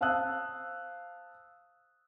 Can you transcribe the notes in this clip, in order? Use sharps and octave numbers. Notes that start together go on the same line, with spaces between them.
C5 F5 A5 D#6 E6 F#6